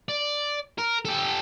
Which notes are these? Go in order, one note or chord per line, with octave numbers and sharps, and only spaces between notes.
D5
A#4
G4 A4